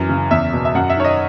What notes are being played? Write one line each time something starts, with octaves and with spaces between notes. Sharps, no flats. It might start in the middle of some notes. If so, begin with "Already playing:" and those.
Already playing: F#2 E3
C#3
E2 E5
B2
E5
F#2 F#5
E5
D#3 C#5
D#5